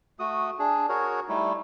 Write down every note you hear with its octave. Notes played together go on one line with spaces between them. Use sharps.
A3 F#4 D#6
D4 G#4
F#4 G#4 A#4 C#5
G3 A3 D#4 E4